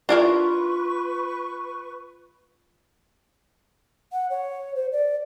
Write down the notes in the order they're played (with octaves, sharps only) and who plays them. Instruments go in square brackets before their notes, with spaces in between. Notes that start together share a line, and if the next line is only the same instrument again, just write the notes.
[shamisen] D4 E4 A#4 [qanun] F4 [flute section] B4 C#6
[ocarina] F#5
C#5
C5
D5